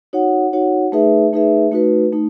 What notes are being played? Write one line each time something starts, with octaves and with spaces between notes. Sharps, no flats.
D#4 F#4 C#5 F#5
D#4 F#4 C#5 F#5
A3 D#4 G#4 B4 E5
A3 D#4 G#4 B4 E5
A3 D#4 F#4 B4
A3 D#4